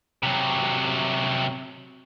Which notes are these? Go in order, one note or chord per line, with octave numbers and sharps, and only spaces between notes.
C3 F#3